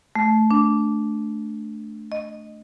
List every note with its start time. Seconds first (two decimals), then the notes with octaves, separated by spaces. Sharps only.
0.16 A3
0.51 D4
2.12 D#5